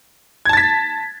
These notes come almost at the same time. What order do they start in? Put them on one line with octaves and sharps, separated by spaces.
G#6 A5 A6 B6